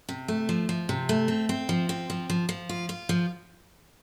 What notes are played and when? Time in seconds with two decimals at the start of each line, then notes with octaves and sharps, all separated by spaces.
0.09 C3
0.28 A3
0.49 F3
0.69 F3
0.89 C3
1.09 A3
1.28 C4
1.49 C4
1.69 F3
1.89 C4
2.10 F3
2.30 F3
2.49 F3
2.69 F4
2.89 F4
3.09 F3